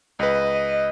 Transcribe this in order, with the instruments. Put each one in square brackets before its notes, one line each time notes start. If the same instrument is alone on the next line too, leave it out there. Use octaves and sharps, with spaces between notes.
[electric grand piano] C#2 B4 [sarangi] D#5